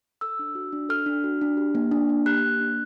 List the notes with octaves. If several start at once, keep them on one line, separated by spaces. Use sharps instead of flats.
A4 E6
D4
F#4
D4
A4 F6
D4
F#4
D4
G4
A#3
D4
A#3
G4 F#6
A#3
D4